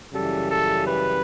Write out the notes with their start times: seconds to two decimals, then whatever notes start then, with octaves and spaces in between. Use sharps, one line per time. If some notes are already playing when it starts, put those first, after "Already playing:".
0.13 F#2 C#3 E3 G3 A4
0.49 A4
0.86 B4